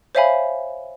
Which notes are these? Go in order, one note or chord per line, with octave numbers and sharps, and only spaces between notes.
C5 C#5 E5 F5 G#5 B5